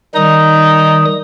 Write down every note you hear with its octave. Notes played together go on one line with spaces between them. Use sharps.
D#3 G3 D#4 D#6